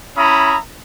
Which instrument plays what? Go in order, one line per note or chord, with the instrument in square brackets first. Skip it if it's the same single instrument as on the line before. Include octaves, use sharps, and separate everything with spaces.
[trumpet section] C#4 E4 E5 A#5 B5 D#6